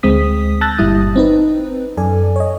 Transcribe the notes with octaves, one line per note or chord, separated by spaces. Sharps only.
D2 G#3 C4 D#6 B6
A5 E6 F#6 G6 A6 A#6
G1 A#2 G3 E4 D#6
C4 D#4 B4
F#2 A4 D5 G#5
C#5 D#5